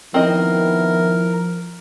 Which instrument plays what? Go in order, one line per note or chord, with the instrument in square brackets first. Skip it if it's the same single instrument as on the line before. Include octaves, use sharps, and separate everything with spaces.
[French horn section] D#3 B3 E4 [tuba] F3 [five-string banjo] C4 D#5 [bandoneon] A#4